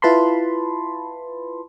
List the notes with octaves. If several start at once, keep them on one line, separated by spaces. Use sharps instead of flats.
E4 F4 B4 A5 B5 C6